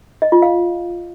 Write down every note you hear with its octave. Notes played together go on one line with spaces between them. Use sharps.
D#5
F4
F5